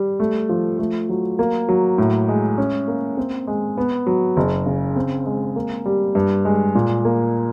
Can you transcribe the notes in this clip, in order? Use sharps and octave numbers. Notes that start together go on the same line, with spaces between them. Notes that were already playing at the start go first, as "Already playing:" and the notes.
Already playing: G3
A3
F3
A3
F#3
A#3
F#3
A2
G#3
C#4
A#3
C4
G#3
B3
F#3
F#1
C#3
C4
G#3
A#3
G3
G2
G#3
A#2
A#3